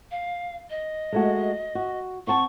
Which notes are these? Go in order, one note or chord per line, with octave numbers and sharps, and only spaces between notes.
F5
D#5
G#3 A3 F#4
F#4
C4 F#5 A5 C#6